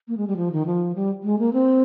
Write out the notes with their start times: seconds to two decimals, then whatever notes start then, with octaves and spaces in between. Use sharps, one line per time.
0.08 A#3
0.17 G#3
0.27 G3
0.37 F3
0.52 D#3
0.66 F3
0.95 G3
1.24 G#3
1.39 A#3
1.53 C4